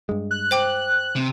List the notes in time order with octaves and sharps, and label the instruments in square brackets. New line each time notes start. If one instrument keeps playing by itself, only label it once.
[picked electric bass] G2 G#3
[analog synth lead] F#6
[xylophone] C5 G5 D6
[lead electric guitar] C3